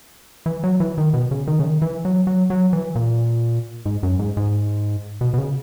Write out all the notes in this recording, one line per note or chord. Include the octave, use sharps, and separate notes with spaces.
E3
F#3
E3
D#3
B2
C#3
D#3
C#3
D#3
E3
F#3
F#3
F#3
E3
A#2
G#2
F#2
G#2
G#2
B2
B2
C#3